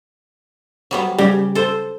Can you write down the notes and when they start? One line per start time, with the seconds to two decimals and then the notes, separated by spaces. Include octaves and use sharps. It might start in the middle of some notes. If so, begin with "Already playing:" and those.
0.91 F#3 G3 B3
1.18 C#3 G3 G4
1.55 A4 C5